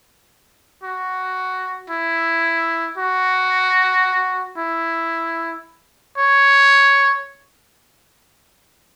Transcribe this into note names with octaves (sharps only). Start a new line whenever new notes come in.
F#4
E4
F#4
E4
C#5